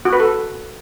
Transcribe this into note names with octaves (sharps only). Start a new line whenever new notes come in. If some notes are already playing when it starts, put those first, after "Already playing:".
F#4
B4
A4